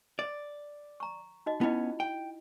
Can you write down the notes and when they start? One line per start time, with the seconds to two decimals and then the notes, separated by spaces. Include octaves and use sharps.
0.19 D5
1.00 A#5 C#6
1.46 D#4 F#4 D#5
1.61 B3 C#4 E4 F4 D#5
2.00 G5